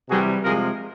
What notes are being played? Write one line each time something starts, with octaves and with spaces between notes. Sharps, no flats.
C3 E3 G3 F#4 G#4
C3 F3 G#3 G#4 A#4